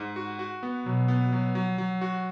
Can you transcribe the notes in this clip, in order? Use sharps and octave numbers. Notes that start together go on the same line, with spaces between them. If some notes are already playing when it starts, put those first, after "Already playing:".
Already playing: G#2
F#4
F#4
B3
B2 F#3
B3
F#3
F#3
F#3
F#4